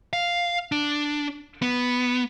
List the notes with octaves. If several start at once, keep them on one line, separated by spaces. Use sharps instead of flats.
F5
D4
B3